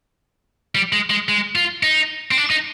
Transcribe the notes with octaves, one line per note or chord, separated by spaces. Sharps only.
G3
G#3
G#3
G#3
F4
D#4
C4
D4
D#4